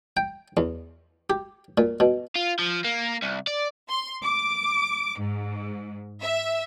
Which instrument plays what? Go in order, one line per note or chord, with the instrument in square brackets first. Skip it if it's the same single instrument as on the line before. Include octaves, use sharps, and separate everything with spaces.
[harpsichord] G5
E2
G4
A#2
B2
[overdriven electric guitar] F4
F3
A#3
C2
D5
[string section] C6
D6
G#2
E5